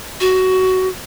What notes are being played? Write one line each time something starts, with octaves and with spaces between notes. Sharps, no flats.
F#4